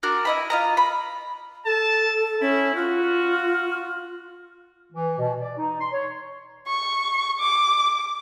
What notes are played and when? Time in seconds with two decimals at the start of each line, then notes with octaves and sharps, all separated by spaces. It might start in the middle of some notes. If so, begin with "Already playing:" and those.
0.03 D4 F#4 A#4
0.25 E4 D#5 B5
0.50 F4 D#5 A#5
0.77 B5
1.66 A4 A5
2.41 C#4 E4
2.75 F4 F#4
4.93 E3
5.18 B2
5.40 D5
5.58 D#4
5.80 C6
5.92 C#5
6.67 C#6
7.40 D6